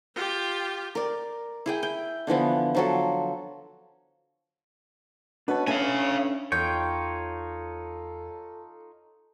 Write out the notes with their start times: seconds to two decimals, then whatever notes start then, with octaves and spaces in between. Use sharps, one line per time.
0.14 F4 G4
0.95 A#4 D5
1.66 E4 G#4 G5
1.83 G5
2.27 D3 E3 F3 B3
2.75 F3 F#3 A4
5.48 B2 D4 B4 C#5 A5
5.67 A2 C#4 E5 F5 G#5
6.52 E2 D#4 F4 A4 C#5 G5